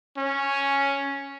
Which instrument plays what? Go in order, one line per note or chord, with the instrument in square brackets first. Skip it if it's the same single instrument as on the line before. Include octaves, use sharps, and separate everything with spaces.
[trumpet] C#4